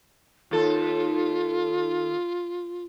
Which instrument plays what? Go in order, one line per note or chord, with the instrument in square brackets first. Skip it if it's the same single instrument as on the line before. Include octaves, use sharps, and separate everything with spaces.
[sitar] D#2 A4 [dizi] F4